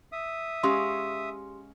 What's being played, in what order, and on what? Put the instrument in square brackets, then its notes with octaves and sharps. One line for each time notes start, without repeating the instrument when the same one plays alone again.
[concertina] E5 D#6
[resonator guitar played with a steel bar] G#3 C#4 F5 [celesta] G4 C6